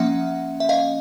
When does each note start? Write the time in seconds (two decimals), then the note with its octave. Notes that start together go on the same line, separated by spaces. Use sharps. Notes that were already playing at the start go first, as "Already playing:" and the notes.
Already playing: F3 A#3 C#4 E5 F#5
0.60 E5
0.69 D#5 F5